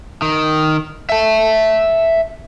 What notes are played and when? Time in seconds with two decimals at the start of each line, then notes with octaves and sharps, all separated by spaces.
0.22 D#3
1.09 E5 A5